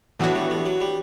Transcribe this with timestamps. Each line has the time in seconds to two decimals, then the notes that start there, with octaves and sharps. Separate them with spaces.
0.19 A2 E3 F#3 B3 D4 F#4
0.35 G3
0.50 G3
0.65 F#3
0.81 G3